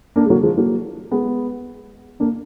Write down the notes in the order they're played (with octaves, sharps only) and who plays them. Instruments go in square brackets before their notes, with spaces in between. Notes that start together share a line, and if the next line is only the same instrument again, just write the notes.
[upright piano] A#3 D4
G#3
F#3 A#3
F3 G#3
F#3 A#3
G#3 B3
A#3 D4